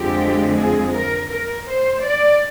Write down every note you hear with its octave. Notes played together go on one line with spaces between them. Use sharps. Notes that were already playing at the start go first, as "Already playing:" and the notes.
Already playing: F2 D3 F3 G#3 C4 G4
G#4
A#4
A#4
C5
D5